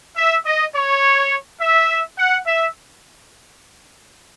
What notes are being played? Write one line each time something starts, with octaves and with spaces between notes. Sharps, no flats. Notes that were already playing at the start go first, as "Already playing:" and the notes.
E5
D#5
C#5
E5
F#5
E5